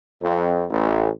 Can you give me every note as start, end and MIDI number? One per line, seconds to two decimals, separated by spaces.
0.22 0.65 41
0.70 1.09 33